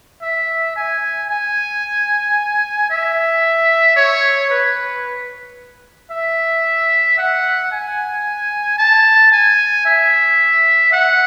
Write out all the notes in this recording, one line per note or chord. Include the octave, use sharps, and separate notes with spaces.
E5
G#5
G#5
E5
C#5
B4
E5
F#5
G#5
A5
G#5
E5
F#5